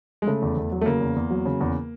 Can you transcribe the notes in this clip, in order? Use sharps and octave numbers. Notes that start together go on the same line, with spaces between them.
G#3
C#3 A3
E2
E2
F#3
A3
C#3 A#3
E2
E2
F#3
C#3
E2